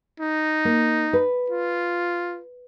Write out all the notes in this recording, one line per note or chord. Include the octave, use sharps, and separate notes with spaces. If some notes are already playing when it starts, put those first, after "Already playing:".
D#4
A#3
B4
F4